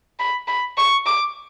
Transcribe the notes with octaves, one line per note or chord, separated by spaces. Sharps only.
B5
B5
C#6
D6